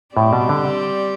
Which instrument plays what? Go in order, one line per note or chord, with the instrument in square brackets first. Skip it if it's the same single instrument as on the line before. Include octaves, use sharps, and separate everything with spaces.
[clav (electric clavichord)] A2 [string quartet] G3 C4 G4 D5
[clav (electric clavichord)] B2
D3